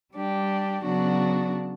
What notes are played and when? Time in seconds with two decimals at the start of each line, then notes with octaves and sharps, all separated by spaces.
0.13 G3 D4 G4
0.83 C#3 F#3 B3 D4 F#4